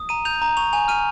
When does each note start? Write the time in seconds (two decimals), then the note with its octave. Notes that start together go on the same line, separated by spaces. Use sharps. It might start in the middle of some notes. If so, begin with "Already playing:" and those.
Already playing: D#6
0.09 A#5 D#7
0.25 G6 F7
0.42 A#5
0.57 C#6 F7
0.73 G#5 F7
0.88 F6 D#7